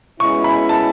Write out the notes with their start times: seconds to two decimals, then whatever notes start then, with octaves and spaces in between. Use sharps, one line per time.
0.20 B2 G#3 C#4 E4 C#6
0.44 B5
0.69 A5